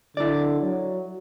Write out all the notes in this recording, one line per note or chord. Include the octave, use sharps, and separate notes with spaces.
D3 E4 D5
F#3